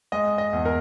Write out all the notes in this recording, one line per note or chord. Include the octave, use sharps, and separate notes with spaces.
G#3 D#5
D#5
E2
A#4